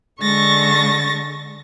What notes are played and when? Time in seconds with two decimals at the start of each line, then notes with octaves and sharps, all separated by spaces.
0.21 D3 G#3 C#6 A6 A#6